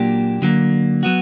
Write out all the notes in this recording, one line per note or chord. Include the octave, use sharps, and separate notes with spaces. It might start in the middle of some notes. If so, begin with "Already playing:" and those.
Already playing: A#2 F#3 A#3 D4 G4
D3 F#3 A#3
F#3 B3 F#4